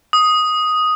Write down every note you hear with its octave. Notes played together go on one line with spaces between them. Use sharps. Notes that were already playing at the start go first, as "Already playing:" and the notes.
D#6